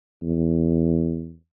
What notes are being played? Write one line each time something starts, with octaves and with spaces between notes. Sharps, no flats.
E2